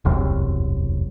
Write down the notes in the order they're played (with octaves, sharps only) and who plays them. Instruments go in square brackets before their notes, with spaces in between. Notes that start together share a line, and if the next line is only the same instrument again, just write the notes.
[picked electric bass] E1 C2 F#2